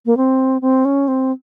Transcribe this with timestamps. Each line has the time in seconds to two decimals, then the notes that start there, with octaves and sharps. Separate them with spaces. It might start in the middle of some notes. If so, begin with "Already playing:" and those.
0.06 A#3
0.17 C4
0.62 C4
0.85 C#4
1.08 C4